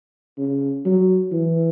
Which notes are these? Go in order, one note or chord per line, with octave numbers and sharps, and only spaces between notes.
C#3
F#3
E3